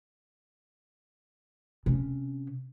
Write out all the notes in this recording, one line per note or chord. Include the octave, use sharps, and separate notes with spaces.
C3 C#4